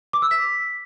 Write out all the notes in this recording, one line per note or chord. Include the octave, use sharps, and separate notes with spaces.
D6
E6
B6